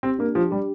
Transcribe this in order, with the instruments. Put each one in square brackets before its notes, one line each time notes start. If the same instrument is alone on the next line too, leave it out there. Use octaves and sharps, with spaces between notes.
[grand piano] C4 [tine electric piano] G4
[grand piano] A#3 [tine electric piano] D4
[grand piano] F3 [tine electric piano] G4
[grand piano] G3 [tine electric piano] G4